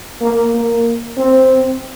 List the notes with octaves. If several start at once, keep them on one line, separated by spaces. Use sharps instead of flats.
A#3
A#3
C4